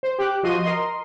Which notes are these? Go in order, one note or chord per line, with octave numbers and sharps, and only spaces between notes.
C5
G4 F#6
F3 F#4 D#5 C6 D#7
A#4 D#5 C6